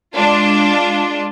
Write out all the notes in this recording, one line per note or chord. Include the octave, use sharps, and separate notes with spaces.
G#3 D4 F4